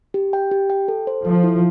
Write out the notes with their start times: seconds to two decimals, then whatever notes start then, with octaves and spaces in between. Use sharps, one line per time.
0.14 G4
0.33 G5
0.51 G4
0.70 G5
0.88 A4
1.07 C5
1.25 F3 A4
1.44 E4